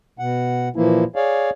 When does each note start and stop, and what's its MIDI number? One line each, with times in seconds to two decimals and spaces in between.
0.19 0.69 47
0.19 0.69 78
0.76 1.04 46
0.76 1.04 52
0.76 1.04 53
0.76 1.04 58
0.76 1.04 64
1.16 1.50 68
1.16 1.50 73
1.16 1.50 74
1.16 1.50 77